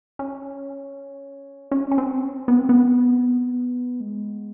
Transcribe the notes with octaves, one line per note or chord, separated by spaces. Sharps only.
C#4
C#4
C#4
C4
B3
C4
B3
G#3